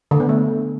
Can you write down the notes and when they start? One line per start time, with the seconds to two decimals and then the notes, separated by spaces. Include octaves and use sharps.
0.11 D3
0.20 B3
0.29 A3